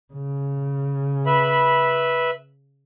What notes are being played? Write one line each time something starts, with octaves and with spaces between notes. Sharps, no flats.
C#3
B4 E5 B5